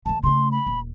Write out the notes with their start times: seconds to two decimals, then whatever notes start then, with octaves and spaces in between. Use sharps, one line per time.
0.06 D#3 G3 A5
0.23 C#3 A3 C6
0.52 B5
0.67 D#1